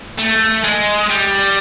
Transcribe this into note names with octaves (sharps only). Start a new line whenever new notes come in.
A3
G#3
G3